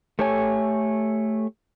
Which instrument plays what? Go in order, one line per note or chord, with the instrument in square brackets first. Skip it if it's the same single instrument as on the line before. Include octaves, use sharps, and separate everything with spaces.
[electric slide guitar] A3 G4 A4 C#5 G#5